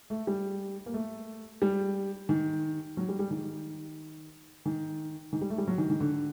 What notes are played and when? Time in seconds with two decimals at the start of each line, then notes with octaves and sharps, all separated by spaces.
0.10 A3
0.27 G3
0.86 A#3
0.94 A3
1.62 G3
2.29 D#3
2.97 F#3
3.09 G3
3.19 G3
3.31 D#3
4.66 D#3
5.33 D#3
5.41 G3
5.50 A3
5.58 G3
5.68 F#3
5.78 D#3
5.90 D#3
6.00 D3